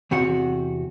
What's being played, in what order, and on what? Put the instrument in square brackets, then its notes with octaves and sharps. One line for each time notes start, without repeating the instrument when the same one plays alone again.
[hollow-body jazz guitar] E2 C3 F#4 F#5